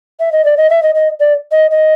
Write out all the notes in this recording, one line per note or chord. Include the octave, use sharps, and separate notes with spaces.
E5
D#5
D5
D#5
E5
D#5
D#5
D5
D#5
D#5